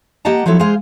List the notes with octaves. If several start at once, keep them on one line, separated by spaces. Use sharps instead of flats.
A#3 G4 D#5 F#5 A5 A#5
F3 F#3 C4 E4 A4 C#5
G#3 G#4 C5 F5